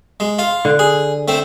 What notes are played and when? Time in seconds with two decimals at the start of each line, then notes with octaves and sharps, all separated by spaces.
0.20 G#3
0.39 F4
0.65 D3
0.79 G#4
1.28 A3 C4